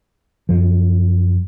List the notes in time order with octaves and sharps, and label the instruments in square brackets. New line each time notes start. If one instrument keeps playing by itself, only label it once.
[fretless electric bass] F#2 F3